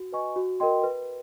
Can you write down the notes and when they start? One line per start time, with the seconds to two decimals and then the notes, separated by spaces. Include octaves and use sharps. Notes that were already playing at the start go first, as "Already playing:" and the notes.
Already playing: F#4
0.12 B4 D#5 G#5 C#6
0.36 F#4
0.60 A#4 D#5 G5 C6
0.84 B4